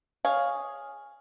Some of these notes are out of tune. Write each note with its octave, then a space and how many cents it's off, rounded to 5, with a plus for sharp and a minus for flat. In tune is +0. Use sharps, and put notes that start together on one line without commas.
G#4 +0 C#5 +0 F5 +0